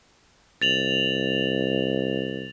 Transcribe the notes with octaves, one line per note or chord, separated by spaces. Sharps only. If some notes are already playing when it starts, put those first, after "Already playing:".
C2 A6 F7 F#7